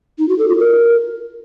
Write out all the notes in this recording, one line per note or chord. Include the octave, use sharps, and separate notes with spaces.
D#4
F#4
A4
F4
A#4